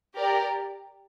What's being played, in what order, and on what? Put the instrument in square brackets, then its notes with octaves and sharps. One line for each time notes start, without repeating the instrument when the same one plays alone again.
[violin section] G4 A#4 D5